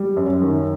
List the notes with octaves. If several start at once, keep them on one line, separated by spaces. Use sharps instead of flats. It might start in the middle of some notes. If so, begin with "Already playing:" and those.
Already playing: G3
F#2
D#3